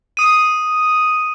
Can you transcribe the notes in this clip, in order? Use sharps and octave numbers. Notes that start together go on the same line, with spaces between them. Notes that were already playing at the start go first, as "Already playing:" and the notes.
D#6 D#7